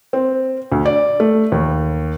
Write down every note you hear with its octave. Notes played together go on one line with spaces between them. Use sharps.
C4
D2
D5
A3
D#2